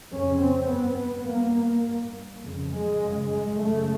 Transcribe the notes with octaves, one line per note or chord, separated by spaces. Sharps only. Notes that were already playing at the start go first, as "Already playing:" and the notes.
F2 C#3 C#4
C4
G2 B3
G2 A#3
G2
F2 C#3
G#3
F#2 C#3
G#3
F#2 C#3 A3